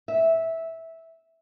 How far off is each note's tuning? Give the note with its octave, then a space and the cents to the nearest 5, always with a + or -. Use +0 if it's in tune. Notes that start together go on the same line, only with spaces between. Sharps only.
E5 -10